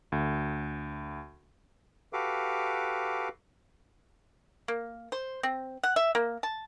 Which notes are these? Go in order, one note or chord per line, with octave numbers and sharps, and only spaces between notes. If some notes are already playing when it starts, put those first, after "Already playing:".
D2
F#4 G4 A4 B4 F5 D6
A#3
C5
C4
F#5
E5
A#3
A5